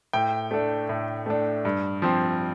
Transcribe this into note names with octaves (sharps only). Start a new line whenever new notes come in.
A2 G5
A3 D4
A2
A3 D4
G2
F3 C4